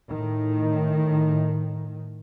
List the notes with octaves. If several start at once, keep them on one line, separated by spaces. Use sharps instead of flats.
A2 D#3